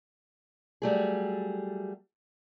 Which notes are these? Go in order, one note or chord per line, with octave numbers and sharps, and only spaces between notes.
F#3 G3 A3 G#4